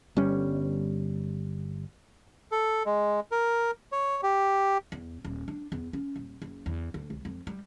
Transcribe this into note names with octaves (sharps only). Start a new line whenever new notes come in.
G1 G3 C#4
A4
G#3
A#4
C#5
G4
E2
D#1
D4
E2
C#4
D#1
F#1
E2
D2
C2
F2
G3